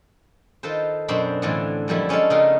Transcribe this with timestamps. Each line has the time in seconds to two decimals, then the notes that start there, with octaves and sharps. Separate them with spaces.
0.63 D#3 F4 A4 B4 C5
1.08 F#2 B2 C4 D4 C5 B5
1.42 A2 D3 E3 A3 D4 F4
1.88 F#2 D3 F3 G3 A3 E4
2.09 G#3 C#4 D4 F4 A4
2.30 C#3 A3 B3 D#4 F4 A#4